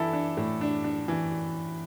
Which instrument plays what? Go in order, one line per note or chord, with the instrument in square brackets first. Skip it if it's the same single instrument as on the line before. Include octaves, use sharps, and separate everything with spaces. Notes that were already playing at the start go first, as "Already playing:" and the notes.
Already playing: [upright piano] E3 D4 [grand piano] E4 A4
[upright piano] D4
A2
D4
D4
E3